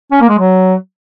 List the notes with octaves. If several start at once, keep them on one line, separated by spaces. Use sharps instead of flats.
C#4
A#3
G#3
F#3